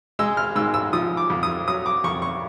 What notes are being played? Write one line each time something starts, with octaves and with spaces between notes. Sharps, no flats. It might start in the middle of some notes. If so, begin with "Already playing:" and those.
G#3 E6
F6
G#2 E6
E6
F3 D#6
D6
F2
D#6
F#3 D#6
D6
F2 C#6
C#6